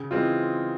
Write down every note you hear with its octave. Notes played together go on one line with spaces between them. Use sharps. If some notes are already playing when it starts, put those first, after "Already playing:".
Already playing: C#3
E3 G#3 C4 F4